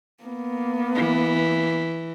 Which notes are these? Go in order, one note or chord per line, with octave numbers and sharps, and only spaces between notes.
A#3 B3
E3